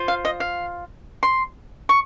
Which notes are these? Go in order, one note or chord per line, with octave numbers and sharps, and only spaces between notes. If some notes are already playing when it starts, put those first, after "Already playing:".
Already playing: F4 C5
F5
D#5
F5
C6
C#6